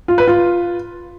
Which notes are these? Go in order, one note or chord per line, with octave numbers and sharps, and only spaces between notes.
F4
B4
F4